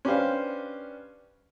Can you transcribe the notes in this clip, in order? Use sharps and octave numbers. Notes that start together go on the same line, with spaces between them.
C#4 D4 G4 B4 C5 F5